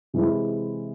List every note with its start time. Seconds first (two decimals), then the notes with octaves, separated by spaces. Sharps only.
0.14 C3 E3 G#3 C4 E4